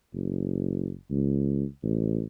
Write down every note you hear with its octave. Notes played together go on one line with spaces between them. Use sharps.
F#1
C#2
A1